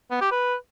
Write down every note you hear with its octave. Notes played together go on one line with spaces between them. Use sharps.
B3
G4
B4